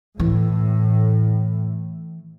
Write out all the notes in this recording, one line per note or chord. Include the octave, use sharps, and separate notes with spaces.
A2 E3